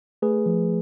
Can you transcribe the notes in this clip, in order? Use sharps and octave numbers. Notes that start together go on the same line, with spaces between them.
A3 G#4 B4
F3